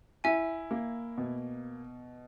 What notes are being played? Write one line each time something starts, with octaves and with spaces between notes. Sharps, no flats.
E4 E5 G#5
A#3
B2